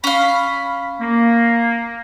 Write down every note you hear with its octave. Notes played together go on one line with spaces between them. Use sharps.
C#4 F5 B5
A#3